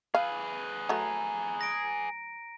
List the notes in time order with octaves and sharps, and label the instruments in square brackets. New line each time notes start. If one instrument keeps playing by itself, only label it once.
[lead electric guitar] G#4 B4 [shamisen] F5
[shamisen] F#3 A3 [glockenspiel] A#5
[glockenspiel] A#6 D7